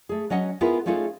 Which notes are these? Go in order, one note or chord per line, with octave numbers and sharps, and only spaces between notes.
A3 G#4
F#3 C#4 D#5 F#5
B3 E4 F4 G#4 A#4 B4
A3 C#4 D#4 F4 G#4 A4